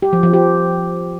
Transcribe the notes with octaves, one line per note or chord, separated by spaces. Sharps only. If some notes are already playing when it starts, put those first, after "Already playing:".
G4
F3
F3
G4